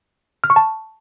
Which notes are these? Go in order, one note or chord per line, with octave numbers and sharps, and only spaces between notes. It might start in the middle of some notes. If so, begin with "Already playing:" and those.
F6
C#6
A5